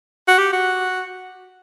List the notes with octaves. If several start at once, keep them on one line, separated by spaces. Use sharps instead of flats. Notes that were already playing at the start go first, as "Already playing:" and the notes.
F#4
G4
F#4